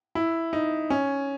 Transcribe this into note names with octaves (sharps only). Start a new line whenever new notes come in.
E4
D#4
C#4